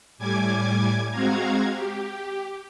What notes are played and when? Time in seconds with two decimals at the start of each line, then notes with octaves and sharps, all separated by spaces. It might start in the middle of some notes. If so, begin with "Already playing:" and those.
0.18 A2 G3 G#5 D6 G#6
1.10 G#3 C4 F#4 F5 A#5 G#6
1.72 G4